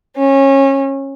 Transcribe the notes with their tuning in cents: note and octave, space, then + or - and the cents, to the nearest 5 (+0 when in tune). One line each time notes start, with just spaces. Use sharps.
C#4 -25